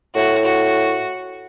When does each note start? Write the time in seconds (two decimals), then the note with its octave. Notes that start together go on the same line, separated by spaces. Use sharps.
0.15 A2 F#4
0.45 F#4